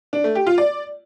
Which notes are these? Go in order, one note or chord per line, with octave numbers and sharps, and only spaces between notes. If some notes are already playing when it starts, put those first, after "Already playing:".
D4
A3
G4
F4
D5